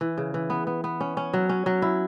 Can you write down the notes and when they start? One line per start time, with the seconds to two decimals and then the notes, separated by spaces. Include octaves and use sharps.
0.01 E3
0.18 C#3
0.34 E3
0.50 B3
0.67 B3
0.84 B3
1.01 C#4
1.17 C#4
1.33 F#3
1.49 C#4
1.66 F#3
1.82 E4